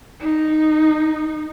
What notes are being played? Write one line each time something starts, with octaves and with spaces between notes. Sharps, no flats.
D#4